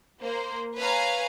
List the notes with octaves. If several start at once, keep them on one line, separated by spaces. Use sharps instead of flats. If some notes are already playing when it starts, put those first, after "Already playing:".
A#3 C5
B4 C#5 F5 G#5 A#5